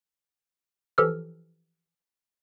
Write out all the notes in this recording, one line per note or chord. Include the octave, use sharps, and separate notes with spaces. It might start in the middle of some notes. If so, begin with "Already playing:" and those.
E3 F3 G4 A4 E6 F6